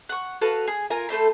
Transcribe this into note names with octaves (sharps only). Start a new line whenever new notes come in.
F#5 C#6
F#4 A4 B4 F5
G#4
F4 A#4 G#5 A#5
A3 A4 C5 B5